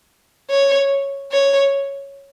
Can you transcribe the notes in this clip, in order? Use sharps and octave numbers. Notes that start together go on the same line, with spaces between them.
C#5
C#5